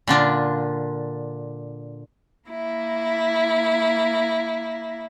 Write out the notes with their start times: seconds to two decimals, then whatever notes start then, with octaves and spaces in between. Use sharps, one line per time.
0.07 A#2 D3 D4 F4
2.47 A#3 E4